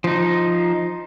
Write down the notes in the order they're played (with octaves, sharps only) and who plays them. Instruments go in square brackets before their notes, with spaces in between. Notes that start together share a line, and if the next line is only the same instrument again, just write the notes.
[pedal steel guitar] F3 D#4